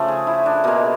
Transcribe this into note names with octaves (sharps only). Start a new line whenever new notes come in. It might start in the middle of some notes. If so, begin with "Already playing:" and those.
Already playing: C#3 F3 A3 C5
G#4
E4
D4
B2 G#3 A#3